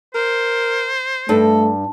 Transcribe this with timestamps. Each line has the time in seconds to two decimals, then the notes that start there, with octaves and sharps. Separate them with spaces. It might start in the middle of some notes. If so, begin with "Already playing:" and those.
0.15 A#4 C5
1.29 G2 A3 A4